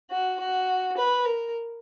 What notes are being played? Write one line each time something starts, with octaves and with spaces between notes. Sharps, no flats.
F#4
F#4
B4
A#4